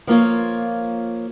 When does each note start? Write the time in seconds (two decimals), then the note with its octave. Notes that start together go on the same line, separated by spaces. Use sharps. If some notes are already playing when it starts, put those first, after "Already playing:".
0.07 F3 A#3 F4 C#5